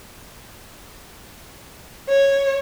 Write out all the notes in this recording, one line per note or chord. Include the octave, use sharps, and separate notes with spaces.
C#5